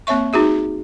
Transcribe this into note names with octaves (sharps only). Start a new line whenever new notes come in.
A#3 C4 C#5 E5 C#6
D#4 F#4 G#4 E5